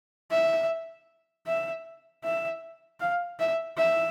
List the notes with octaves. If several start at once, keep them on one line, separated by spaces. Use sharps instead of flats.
E5
E5
E5
F5
E5
E5